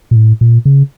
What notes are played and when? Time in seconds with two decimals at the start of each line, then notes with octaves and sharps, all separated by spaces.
0.11 A#2
0.16 A2
0.41 A#2
0.65 C#3